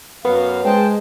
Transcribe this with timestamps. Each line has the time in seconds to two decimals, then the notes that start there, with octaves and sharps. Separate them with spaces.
0.25 F#2 F#3 B3 F5
0.65 G#3 C5 G5 A5